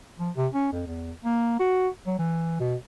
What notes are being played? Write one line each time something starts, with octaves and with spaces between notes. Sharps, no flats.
F3
C3
C#4
F2
E2
A#3
F#4
F#3
E3
B2